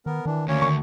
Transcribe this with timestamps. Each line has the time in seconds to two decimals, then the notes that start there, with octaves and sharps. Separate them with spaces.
0.06 D#3 B3 A#4
0.26 D#3 E3 D4
0.48 D2 A#3 C#4 C#5
0.62 D#3 C#6